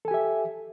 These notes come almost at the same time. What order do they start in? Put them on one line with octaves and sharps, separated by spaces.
A4 G#5 G4 E5